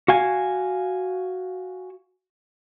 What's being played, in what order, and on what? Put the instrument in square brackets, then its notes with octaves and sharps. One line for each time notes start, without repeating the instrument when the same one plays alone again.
[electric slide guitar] F#4 F5 G#5